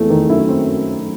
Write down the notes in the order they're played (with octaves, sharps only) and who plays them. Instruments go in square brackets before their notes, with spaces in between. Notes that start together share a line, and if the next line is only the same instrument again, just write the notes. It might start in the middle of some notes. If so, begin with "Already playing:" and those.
Already playing: [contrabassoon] E2 [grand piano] A3 C4
[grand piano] D#3
[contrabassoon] F#2 [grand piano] E4
[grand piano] C4